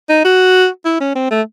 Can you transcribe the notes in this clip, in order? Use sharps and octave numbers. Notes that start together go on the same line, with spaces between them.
D#4
F#4
E4
C#4
C4
A3